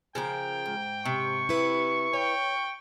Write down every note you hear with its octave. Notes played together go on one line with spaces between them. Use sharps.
C#3 F3 A#4 G5
G#2
C3 C#6
E4 B4
C#5 G5